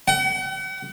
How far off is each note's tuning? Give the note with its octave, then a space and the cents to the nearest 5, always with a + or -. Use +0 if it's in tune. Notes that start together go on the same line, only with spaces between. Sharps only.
F#5 +40